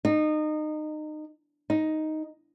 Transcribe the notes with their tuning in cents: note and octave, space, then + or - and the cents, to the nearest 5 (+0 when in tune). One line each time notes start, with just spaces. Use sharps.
D#4 -25
D#4 +5